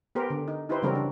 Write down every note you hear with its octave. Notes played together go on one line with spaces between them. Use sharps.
B3 G4 A#4 C5
D3
D#4
D#4 E4 G4 B4 C5
C#3 E3 F#3 G3 C4 A#4
D4